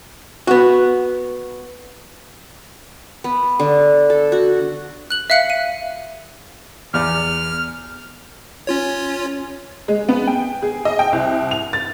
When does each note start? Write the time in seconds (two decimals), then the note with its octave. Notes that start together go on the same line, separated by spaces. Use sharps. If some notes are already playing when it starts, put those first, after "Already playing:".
0.47 B3 F#4
3.24 B3
3.59 D3
4.10 A4
4.32 F#4
5.10 F#6 F#7
5.30 E5 F5 F#6 C#7
5.50 D#7
6.94 E2 D5 F6
8.67 C#4 F4 C#5
9.88 G#3
10.09 B3
10.27 G5
10.62 G#4
10.85 D#5
10.99 G5
11.13 C2
11.51 F7
11.73 A6